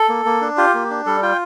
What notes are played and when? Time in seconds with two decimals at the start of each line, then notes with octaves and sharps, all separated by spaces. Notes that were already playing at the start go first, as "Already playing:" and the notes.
Already playing: A4
0.09 A#3
0.25 A#3
0.41 D4
0.57 F4 G4
0.74 A#3
0.90 D4
1.06 G3 A4
1.22 F4 G5